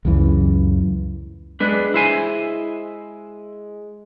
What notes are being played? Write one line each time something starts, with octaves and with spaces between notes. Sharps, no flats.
C#2 F#2 C#3 E3
G#3 D4 B4
E4 C5 G#5